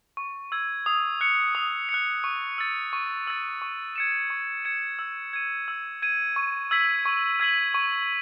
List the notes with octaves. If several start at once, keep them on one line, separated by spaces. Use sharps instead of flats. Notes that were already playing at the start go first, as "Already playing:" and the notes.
C#6
E6 G#6
D#6
F#6 C#7
D#6
C#7
F#6
C#6
E6 A6
C#6
E6 A6
C#6
G#6 C#7 E7
C#6
G#6 C#7 E7
E6
G#6 D#7
E6
G#6 D#7
C#6
E6 G#6 B6 F#7
C#6
E6 G#6 B6 F#7
C#6